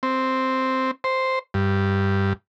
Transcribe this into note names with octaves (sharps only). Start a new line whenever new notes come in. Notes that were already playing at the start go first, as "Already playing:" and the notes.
C4
C5
G2